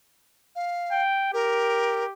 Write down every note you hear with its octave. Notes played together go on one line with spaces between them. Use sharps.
F5
G5
G4 A#4